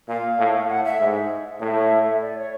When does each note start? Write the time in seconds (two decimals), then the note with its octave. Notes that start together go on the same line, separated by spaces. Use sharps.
0.08 A#2 F5
0.39 A2
0.68 A2 F#5
0.85 E5
1.00 G#2
1.60 A2 E5
2.21 D5
2.36 C#5